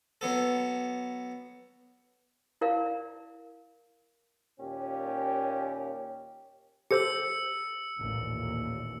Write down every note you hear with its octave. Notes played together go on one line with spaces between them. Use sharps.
F#3 B3 A4
E4 A#4 D5 F5
D#2 A#2 C#4 G4
G4 A4 C5 E6 C#7
A1 D#2 A#2